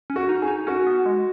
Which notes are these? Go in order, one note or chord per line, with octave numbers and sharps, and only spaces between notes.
C#4
F#4
D#4
G#4
D#4
C#4 F#4
B3
G#3